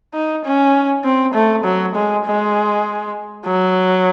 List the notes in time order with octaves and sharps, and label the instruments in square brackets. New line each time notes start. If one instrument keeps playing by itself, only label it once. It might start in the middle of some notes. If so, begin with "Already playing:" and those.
[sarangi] D#4
C#4
C4
A3
F#3
G#3
G#3
F#3